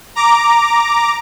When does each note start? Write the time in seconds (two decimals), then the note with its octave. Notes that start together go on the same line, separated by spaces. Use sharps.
0.15 A#5 D6